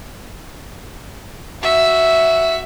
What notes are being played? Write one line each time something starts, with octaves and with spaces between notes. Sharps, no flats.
F#4 E5